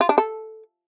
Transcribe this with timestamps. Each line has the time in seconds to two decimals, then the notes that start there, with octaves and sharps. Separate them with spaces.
0.01 F4
0.09 D4
0.18 A4